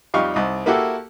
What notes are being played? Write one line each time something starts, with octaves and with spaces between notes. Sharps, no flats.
F2 G3 D#4 G4 F5 C#6
C2 D#4
A#3 E4 F#4 G4 A4